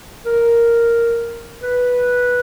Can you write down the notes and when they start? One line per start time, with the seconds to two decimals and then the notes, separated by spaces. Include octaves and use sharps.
0.26 A#4
1.63 B4